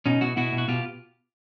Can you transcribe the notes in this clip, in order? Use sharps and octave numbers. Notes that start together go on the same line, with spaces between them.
B2 C#4 D#4
B2 E4 F#4
B2 E4 F#4
B2
F#4
B2 F4 G4